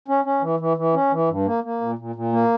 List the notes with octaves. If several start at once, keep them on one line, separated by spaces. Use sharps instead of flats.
C#4
C#4
E3
E3
E3
C#4
E3
G2
A#3
A#3
A#2
A#2
A#2
A#3